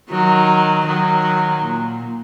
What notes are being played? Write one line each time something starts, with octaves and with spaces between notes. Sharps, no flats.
D#3 F#3
D#3 F#3
A#2